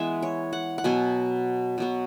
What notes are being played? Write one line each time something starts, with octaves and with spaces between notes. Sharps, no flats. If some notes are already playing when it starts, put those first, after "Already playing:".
Already playing: E3 G#3 B3 E5 G#5
C#5
F#5
F#5
B2 F#3 B3 G#5
B2 F#3 B3